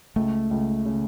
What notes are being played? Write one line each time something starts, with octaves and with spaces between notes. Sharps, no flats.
C#2 A3
C#2
C#3